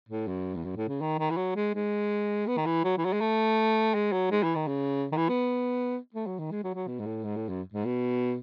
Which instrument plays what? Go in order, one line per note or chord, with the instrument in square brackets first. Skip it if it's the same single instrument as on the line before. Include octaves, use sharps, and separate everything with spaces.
[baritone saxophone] A2
F#2
E2
F#2
A2
C#3
D#3
D#3
E3
F#3
G#3
G#3
B3
D#3
E3
F#3
E3
F#3
G#3
A3
G#3
F#3
G#3
E3
D#3
C#3
D#3
E3
B3
A3
F#3
D#3
G#3
F#3
F#3
B2
G#2
A2
G#2
A2
F#2
G#2
B2